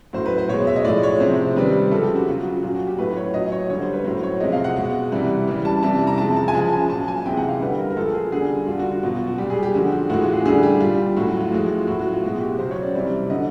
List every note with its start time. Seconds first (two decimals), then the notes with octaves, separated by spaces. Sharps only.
0.13 A2 F#3 C5
0.26 B4
0.38 C5
0.49 B2 C#5
0.53 G#3
0.67 E5
0.76 D#5
0.85 A2 F3 G#3 D5
1.03 C#5
1.20 C3 F3 G#3 C5
1.56 C3 D#3 G3 B4
1.91 C#3 F3 G#3 A4
2.03 G4
2.16 F#4
2.28 C#3 F#3 F4
2.39 F#4
2.50 F4
2.62 A#2 F#3 F4
2.75 F#4
2.87 G4
2.99 A2 F#3 B4
3.17 C#5
3.33 A#2 F#3 D#5
3.52 C#5
3.70 D3 G3 C#5
3.81 C5
3.93 B4
4.04 A2 F#3 C5
4.23 C#5
4.40 C3 F3 G#3 D#5
4.52 F5
4.64 F#5
4.76 B2 G#3
5.12 C3 E3 G3
5.48 C#3 E3 G3
5.65 A5
5.83 C3 E3 G3 A5
6.07 A#5
6.18 C3 F3 G#3 A5
6.36 A5
6.48 G#5
6.53 C#3 F3 G#3 A5
6.72 G#5
6.89 A#2 F#3 A5
7.08 G#5
7.26 C3 E3 G#3 G5
7.37 F#5
7.48 F5
7.60 D3 G3 B4
7.78 A#4
7.90 A#4
7.96 A#2 F3 G#3 A4
8.14 G#4
8.32 D3 G3 G#4
8.62 F#4
8.67 D3 G3 F4
8.79 F#4
8.91 F#4
9.03 B2 F#3 F4
9.15 F#4
9.27 F#4
9.38 A#2 G3 G4
9.50 G#4
9.63 G4
9.74 D3 F3 G#3 F#4
9.92 F#4
10.10 A2 E3 G#3 F#4
10.22 F4
10.33 G#4
10.46 D3 G3 G#4
10.63 G4
10.80 A#2 G3 F4
11.17 A2 F#3 F#4
11.28 F4
11.40 F4
11.52 A2 F3 G#3 F#4
11.87 A2 F#3 F#4
11.99 F#4
12.12 F4
12.23 B2 G#3 F#4
12.40 G4
12.58 C#3 F#3 C5
12.71 C#5
12.82 D5
12.95 C3 E3 G3
13.30 D3 F#3 D#5